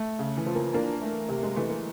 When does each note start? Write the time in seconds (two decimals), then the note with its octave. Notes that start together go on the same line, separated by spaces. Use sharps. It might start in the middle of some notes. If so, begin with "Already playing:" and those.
Already playing: A3
0.19 C#3
0.37 E3
0.46 F3
0.55 A#3
0.73 A#3 D4
1.01 A3
1.29 C3
1.43 G#3
1.56 E3 A3
1.69 A#3